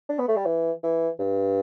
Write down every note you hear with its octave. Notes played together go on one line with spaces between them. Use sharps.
D4
B3
A3
G3
E3
E3
G2